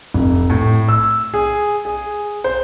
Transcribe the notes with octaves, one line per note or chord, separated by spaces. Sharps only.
F1
A2
E6
G#4
G#4
C5